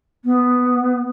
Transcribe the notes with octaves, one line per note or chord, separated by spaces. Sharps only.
B3